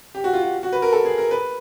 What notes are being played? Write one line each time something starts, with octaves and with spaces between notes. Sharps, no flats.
G4
F#4
F4
F#4
F#4
B4
A#4
A4
G#4
A#4
B4